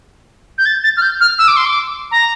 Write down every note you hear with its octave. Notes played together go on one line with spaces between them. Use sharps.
G6
A6
A6
F6
G6
F6
E6
D6
C6
D6
A#5